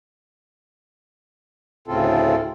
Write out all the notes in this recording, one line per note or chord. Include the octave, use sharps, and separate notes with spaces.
D2 A2 C#3 C4 F4 A4